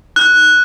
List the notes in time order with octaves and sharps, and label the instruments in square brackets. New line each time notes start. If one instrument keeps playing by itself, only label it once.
[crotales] F#6